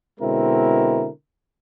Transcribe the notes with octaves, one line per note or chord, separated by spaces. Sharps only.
B2 D3 G#3 C4 E4 A#4